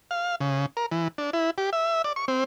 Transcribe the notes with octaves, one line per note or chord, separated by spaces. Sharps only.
F5
C#3
A#4
E3
D4
E4
G4
E5
D5
C#6
C4